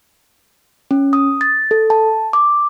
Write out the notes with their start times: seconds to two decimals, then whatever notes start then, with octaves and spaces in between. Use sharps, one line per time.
0.91 C#4
1.13 D#6
1.41 A6
1.71 A4
1.90 A5
2.33 D6